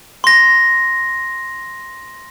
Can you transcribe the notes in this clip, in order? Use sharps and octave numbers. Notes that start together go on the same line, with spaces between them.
C6 A#6